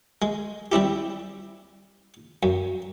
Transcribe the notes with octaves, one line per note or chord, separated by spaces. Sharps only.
G#3
G3 C4 E4 G4
F#2